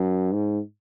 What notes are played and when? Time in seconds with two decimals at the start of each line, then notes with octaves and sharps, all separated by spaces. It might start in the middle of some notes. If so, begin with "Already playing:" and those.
Already playing: F#2
0.33 G#2